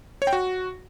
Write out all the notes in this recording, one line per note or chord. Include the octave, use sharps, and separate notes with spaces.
C#5
G5
F#4